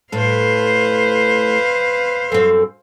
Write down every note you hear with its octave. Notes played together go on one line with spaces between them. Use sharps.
A2 A4 B4 C5 F5
F#2 C4 A4